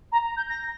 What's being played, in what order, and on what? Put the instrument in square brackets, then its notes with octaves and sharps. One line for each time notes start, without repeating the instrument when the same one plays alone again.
[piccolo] A#5
G6
A#6